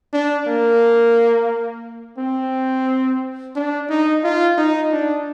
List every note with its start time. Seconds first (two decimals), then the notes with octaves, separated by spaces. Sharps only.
0.13 D4
0.47 A#3
2.18 C4
3.55 D4
3.90 D#4
4.24 F4
4.58 D#4
4.92 D4